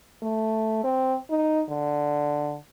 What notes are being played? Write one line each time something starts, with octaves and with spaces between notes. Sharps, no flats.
A3
C4
D#4
D3